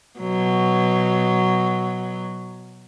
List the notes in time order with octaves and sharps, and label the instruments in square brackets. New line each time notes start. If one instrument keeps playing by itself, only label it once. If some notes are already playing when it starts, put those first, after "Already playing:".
[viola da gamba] B2 F#3